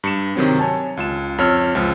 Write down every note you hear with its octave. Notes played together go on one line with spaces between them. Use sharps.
G2 C#7 E7
C3 D#3 F#3 C4
C#5 G#5 A5
C#2 F4 E7
F2 F4 C#5 E6 F6
C#2 F3